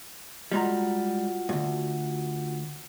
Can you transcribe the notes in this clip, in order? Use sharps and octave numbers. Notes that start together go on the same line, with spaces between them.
G3 G#3 F4 F#4 F#5 A#5
D2 G2